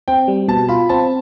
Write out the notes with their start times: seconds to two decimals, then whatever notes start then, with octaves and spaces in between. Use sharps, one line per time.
0.08 C4 G5
0.28 G3
0.48 B2 A5
0.69 F4 B5
0.89 C4 A5